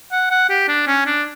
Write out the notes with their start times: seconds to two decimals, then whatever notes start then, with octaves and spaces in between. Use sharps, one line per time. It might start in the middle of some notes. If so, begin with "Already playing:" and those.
0.12 F#5
0.31 F#5
0.49 G4
0.68 D4
0.87 C#4
1.06 D4